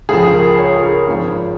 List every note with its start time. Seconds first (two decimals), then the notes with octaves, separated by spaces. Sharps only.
0.09 C#2 C#3 F3 G#4
0.23 G#4
0.34 A#4
0.59 C#5
0.76 G#4
0.84 A#4
1.08 G#1 G#2 F3